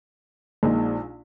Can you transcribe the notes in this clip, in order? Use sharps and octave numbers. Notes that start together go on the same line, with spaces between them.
A#1 A#2 G#3 D#4